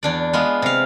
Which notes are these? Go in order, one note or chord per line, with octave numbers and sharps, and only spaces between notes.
E2 D4 D5
G#3 B3 F4
C3 F5